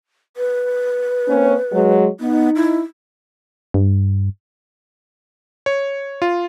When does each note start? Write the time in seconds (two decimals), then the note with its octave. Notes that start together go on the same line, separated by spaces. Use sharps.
0.37 B4
1.28 A#3 C4 C#4
1.72 F#3 G#3
2.20 B3 D#4
2.56 E4
3.74 G2
5.66 C#5
6.22 F4